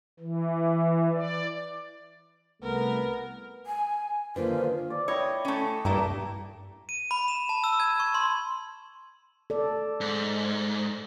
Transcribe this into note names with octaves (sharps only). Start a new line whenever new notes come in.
E3
D5
C2 A3 B3 A#4
G#5
D3 D#3 A#3 F4 B4 C5
D5
E4 C#5 D#5 G5
A3 C#4
G2 A3 A#3 E4
D#7
B5
E7
A5
E6
G#6
C#6
C6
A4 D5
G#2